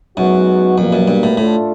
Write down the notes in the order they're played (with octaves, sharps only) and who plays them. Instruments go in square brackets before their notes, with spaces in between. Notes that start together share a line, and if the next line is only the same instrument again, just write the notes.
[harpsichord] F#2 [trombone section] G#3 B3 D#4 F#4
[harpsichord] F2 [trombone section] B2 G3 A#3
[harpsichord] F#2
G2
A2
[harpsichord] A2 [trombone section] A3 D4 F4 A4